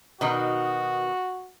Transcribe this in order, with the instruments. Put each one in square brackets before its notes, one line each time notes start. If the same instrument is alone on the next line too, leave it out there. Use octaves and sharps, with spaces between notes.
[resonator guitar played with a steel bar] B2 D#3 D#4 [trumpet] F#4